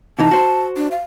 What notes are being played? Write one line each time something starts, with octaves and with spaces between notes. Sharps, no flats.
C3 E3 D#4 A5
F#4 C5
D4
F5